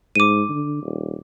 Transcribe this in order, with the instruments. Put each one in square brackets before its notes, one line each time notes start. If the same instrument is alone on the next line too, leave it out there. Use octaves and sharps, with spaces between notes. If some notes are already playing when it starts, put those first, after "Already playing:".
[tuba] G#2 [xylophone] D6 D#7
[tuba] D3
D#1